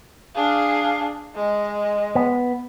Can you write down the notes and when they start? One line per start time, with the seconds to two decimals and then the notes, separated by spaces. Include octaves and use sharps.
0.35 D4 G#4 F5
1.35 G#3 D#5
2.15 B3